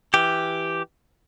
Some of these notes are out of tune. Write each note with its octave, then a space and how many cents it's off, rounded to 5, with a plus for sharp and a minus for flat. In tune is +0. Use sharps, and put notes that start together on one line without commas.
E3 +0 G4 +0